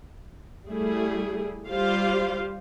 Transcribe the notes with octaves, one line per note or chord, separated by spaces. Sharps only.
G3 A3 E4 G#4
G3 F4 G4 C5 F5